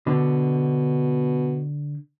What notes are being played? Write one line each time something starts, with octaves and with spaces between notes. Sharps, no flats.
B2 D3